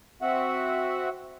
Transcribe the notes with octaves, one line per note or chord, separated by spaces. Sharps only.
C4 F#4 E5 F#5